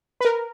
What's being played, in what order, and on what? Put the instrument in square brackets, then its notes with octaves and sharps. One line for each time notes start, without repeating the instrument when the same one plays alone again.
[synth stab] B4
A#4